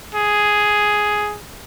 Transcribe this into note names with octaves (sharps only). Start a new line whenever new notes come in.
G#4